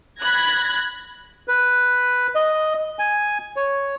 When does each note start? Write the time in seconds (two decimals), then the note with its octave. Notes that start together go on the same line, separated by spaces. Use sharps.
0.21 B5 F#6 G#6 A#6
1.47 B4
2.35 D#5
2.99 G#5
3.56 C#5